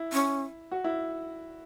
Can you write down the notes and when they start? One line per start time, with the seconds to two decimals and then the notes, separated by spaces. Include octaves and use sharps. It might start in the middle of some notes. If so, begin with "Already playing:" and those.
Already playing: E4
0.13 C#4
0.71 F#4
0.84 E4